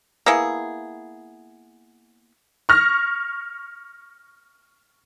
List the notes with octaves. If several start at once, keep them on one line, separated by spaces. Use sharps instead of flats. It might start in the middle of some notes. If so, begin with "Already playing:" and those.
A#3 B3 E4 G#4
C#6 F6 A#6